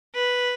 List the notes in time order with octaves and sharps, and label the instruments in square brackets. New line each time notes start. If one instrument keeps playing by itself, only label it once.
[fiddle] B4